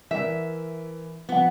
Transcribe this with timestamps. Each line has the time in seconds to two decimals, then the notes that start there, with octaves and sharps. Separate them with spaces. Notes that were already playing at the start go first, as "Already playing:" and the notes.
0.11 E3 A#4 E5
1.29 F3 B3 F#5